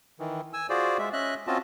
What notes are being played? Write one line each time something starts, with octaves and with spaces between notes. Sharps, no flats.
D#3 E3
G#5 E6
F4 F#4 G#4 C5 D5
G#3 E5
C#4 D#5 E5 F#6
C4 C#4 F4 F#4 D#5 A5